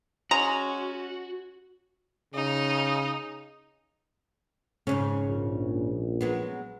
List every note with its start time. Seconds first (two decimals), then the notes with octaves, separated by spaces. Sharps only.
0.31 G#3 C#4 F#4 A#5
2.34 C#3 D#4
4.87 F2 G#2 C#3 C#4
5.26 A#1
6.21 F#3 G#3 B3